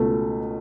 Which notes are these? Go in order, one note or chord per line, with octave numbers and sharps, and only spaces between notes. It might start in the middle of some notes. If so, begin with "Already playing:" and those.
Already playing: C#2 B2 A3